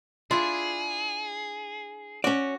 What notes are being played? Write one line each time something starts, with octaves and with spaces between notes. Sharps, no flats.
D4 E4 F4 G#4
C#4 F#4 D5